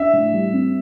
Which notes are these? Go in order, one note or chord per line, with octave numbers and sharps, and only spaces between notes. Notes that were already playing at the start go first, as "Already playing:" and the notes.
Already playing: D4 E5
A2
G3
C4